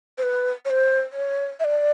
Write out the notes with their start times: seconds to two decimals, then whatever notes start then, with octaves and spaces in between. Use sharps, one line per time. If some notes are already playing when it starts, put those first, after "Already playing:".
0.18 C5
0.22 B4
0.65 C#5
0.70 C5
1.13 C#5
1.60 E5
1.64 D5